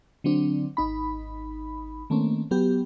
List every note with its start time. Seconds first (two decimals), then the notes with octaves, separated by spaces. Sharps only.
0.24 D3 F#3 C4 D4
0.77 G#1 D#4 B5
2.10 D#3 A3 A#3 C4 C#4
2.51 F#3 B3 G4